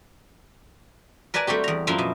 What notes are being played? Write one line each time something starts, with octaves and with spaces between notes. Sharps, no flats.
A#4 B4 D5 G#5 A5
G3 A3 C4 F#4 G4
E2 A#5
F#2 F3 A#3 E4 F4
B2